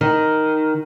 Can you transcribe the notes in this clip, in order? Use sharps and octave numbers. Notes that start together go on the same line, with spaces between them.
D#3